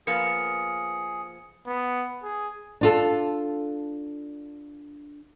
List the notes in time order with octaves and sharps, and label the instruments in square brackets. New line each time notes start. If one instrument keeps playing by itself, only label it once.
[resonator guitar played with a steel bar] F3 A#3 B3 [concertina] G#4 [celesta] C#7
[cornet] B3
G#4
[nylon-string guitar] D4 F4 A4